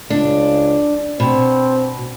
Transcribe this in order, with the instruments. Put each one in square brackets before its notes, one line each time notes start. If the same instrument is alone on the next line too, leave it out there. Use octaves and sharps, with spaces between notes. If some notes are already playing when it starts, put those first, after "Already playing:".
[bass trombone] C#2 [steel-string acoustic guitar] D4
[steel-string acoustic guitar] B2 [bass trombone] C4